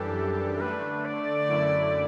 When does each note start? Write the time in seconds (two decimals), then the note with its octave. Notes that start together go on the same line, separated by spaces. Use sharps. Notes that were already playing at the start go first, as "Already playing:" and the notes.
Already playing: F#2 E3 G3 D4 G4 A4
0.55 A4
0.60 D3 A3 D4 B4
1.05 D5
1.47 F#2 D3 A3 E4